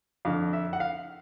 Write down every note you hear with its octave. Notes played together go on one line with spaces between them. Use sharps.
F2 D3 F5
E5
F#5
F5